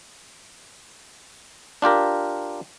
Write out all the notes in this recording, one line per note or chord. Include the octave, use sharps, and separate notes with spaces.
D4 F4 G4 A#4